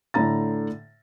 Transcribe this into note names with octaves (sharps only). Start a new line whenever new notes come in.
A2 D3 A#5 A6